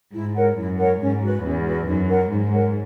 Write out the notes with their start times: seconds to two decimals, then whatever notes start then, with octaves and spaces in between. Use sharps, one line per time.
0.14 G#2 E4
0.35 A#4 C#5 F#5
0.57 F#2 E4
0.79 A#4 C#5 F#5
1.01 G#2 C#4
1.22 F#4 B4
1.44 E2 C#4
1.65 F#4 B4
1.87 F#2 D#4
2.09 A#4 C#5 F#5
2.31 G#2 D#4
2.53 A#4 C#5 F#5